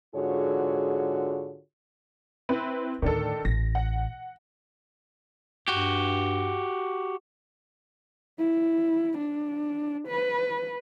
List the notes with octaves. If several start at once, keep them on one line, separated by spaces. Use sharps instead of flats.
G#2 D3 F4 F#4 G#4 C#5
C4 E4 B4
D2 A2 D#3 D4 A4
A1 A#6
F#5
G2 F#4 G4
E4
D4
B4